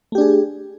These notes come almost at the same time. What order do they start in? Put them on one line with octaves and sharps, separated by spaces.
A3 G4 D4 G#4